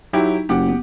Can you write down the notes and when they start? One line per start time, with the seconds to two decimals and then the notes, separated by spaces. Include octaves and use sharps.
0.13 F#3 D#4 E4 G4
0.49 F#1 G4 F#5 D6
0.69 B3